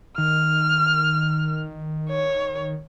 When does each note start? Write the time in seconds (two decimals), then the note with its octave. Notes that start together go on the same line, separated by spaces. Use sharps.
0.18 D#3 F6
2.10 C#5